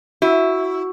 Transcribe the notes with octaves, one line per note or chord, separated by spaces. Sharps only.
E4 F#4